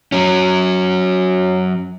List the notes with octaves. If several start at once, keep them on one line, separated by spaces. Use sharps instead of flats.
F#3 C#4